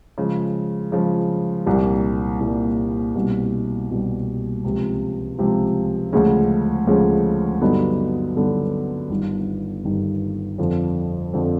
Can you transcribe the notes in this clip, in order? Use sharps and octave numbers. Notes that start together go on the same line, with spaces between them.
C#3 F3 G#3
C#3 F3 G#3
C2 A#2 G3 A#3
C2 A#2 G3 A#3
C2 B2 G3
C2 B2 G3
C#2 C3 F3
C#2 C3 F3
D2 C#3 F3 G#3 C#4
D2 C#3 F3 G#3 C#4
G2 D3 F#3 B3 D#4
G2 D3 F#3 B3 D#4
G1 G2 D#3
G1 G2 D#3
F2 D3 F3
F2 D3 F3